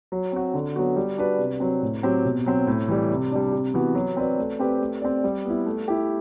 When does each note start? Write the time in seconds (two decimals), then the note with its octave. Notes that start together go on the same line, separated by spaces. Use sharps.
0.12 F#3
0.32 C4 F#4
0.54 D3
0.76 F#3 B3 F#4
0.96 G3
1.18 D4 F#4 B4 D5
1.39 C3
1.60 F#3 C4
1.82 A2
2.03 F#3 C4 G4
2.25 B2
2.46 F#3 C4
2.67 A2
2.88 E3 G3
3.11 C3
3.32 G3 D4
3.52 C3
3.74 E3 B3 F#4
3.95 F#3
4.17 C4 F#4 B4 D5
4.38 A3
4.59 C4 G4 B4 D5
4.81 A3
5.02 C4 G4 D5
5.24 G3
5.45 B3 E4
5.66 A3
5.88 E4 G4